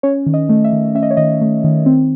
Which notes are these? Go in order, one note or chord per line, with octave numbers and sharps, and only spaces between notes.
C#4 C#5
D#3
D#5
A3
E5
D#3
C#4 E5
D#5
C#5
D#3 D#5
A3
D#3
C4